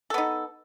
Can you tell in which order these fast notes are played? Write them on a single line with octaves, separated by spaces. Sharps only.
A4 B3 D#4